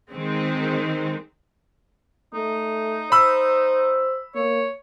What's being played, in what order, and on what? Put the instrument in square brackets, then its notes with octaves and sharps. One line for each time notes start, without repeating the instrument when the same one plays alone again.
[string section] D#3 G#3 C4
[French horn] A3 [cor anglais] D#4
[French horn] C5 [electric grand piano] B5 E6
[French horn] A#3 [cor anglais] C#5